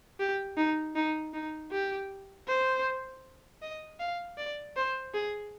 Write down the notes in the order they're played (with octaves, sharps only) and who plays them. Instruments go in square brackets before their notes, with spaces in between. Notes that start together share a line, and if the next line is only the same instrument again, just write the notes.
[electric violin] G4
D#4
D#4
D#4
G4
C5
D#5
F5
D5
C5
G#4